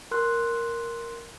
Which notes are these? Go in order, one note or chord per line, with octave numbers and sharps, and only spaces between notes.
A#4 C6 F#6